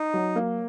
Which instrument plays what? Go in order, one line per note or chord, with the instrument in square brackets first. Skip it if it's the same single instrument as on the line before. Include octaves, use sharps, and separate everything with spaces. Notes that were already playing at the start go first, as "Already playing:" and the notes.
Already playing: [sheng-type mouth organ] D#4
[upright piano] F#3
A#3